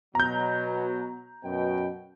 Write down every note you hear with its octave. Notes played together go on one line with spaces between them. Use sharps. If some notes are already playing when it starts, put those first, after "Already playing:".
B2 F#3 A#5 G6
F#2 B2 G5